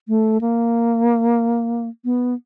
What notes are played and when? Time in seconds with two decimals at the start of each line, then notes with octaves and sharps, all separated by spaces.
0.08 A3
0.41 A#3
2.05 B3